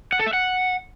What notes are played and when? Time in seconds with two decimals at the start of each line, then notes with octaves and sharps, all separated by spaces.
0.13 F#5
0.19 A4
0.26 E5
0.33 F#5